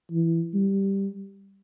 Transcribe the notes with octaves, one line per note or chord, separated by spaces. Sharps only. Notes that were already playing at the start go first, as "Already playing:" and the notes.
E3
G3